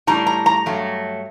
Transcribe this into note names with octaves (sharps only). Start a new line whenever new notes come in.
A2 G3 D4 A#5
A#5
A#5
G2 F#3 A3